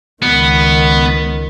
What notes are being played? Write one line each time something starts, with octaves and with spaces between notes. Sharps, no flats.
C#2 D#3 B3